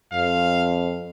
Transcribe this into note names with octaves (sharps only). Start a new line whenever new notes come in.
F2 F5